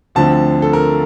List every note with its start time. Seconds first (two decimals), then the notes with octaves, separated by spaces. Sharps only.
0.15 D2 D3 F3 C4 A5
0.62 A4
0.73 A#4